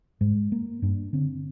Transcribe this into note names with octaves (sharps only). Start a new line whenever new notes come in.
G#2 G#3
A#3
G2 D4
D3 C4